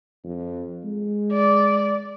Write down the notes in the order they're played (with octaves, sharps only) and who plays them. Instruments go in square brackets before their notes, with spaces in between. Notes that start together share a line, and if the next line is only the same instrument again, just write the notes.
[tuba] F2
G#3
[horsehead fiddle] D5